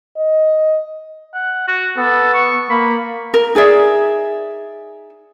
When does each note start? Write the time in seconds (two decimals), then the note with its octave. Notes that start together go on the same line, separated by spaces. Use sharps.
0.17 D#5
1.34 F#5
1.68 F#4
1.98 B3 A4
2.34 C#6
2.70 A#3 B5
3.34 A#4
3.55 D#4 G#4 D5 E5